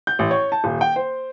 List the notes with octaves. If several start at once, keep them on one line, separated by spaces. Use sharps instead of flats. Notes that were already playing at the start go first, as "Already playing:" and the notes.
G6
A1
C#5
A5
D#1
G5
C5